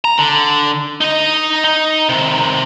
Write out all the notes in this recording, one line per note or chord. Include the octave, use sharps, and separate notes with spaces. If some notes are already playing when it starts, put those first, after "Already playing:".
A#5
D3
D#4 D#5
D#4
C3 D#3